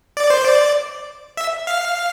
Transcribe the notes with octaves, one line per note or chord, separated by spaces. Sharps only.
D5
C5
D5
E5
F5